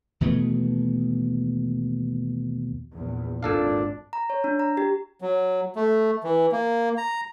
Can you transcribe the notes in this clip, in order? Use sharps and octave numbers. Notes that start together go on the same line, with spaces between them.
D#2 B2 E3 A3
A#1 E2
G#1 A#2 D4 A4 F5
A#5
C#5
D4
A#5
G4
F#3
A3
E3
A#3
A#5